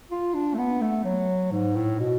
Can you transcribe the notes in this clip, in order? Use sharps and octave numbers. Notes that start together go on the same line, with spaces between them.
F4
D4
A3
B3
A3
F#3
G#2
A2
B2